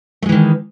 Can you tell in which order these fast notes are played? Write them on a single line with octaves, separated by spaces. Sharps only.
A3 G#3 E3 D#3